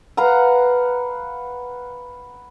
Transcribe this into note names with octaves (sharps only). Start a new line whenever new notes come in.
B4 F5 F#5 A#5